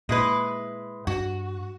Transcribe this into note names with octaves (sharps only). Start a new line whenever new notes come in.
A#2 G#3 E4 B4
G2 F#4